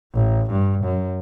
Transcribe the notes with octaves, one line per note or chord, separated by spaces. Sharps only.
A1
G2
F#2